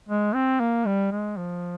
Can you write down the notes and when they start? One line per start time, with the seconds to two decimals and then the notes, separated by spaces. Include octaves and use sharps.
0.09 G#3
0.35 C4
0.60 A#3
0.86 G3
1.12 G#3
1.37 F3